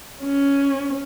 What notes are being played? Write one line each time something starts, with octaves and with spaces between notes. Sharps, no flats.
C#4